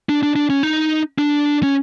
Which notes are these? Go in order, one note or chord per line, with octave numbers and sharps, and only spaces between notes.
D4
D4
D4
C#4
D#4
D4
C#4